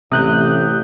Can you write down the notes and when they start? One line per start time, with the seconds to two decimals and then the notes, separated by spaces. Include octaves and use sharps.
0.12 A1 C3 D#6 F#6 G6